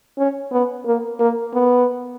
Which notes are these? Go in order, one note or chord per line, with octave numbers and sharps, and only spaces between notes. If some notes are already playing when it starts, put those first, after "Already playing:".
C#4
B3
A#3
A#3
B3